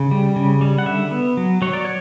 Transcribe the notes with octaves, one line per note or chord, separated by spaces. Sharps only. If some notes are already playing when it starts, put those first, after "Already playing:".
Already playing: C#3
G3
C#3
G3
F#5
D3 E5
B3
F#3
F#3 C#5
D5
C#5